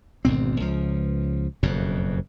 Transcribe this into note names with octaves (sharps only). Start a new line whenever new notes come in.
G#1 D2 B2 C4
C#2 F3
F#1 F2 B2